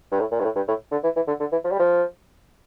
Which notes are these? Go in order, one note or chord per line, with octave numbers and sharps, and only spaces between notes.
G2
A2
A#2
G2
A2
G2
A2
D3
E3
E3
D3
D3
E3
F3
G3
F3